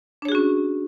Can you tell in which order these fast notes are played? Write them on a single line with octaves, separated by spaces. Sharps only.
D4 C#5 G#4 F#4 C#4